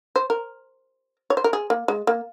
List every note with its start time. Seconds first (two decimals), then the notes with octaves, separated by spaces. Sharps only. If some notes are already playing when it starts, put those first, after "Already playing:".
0.16 C5
0.30 A#4
1.30 C#5
1.37 C5
1.44 A#4
1.53 G#4
1.70 A#3
1.88 G#3
2.07 A#3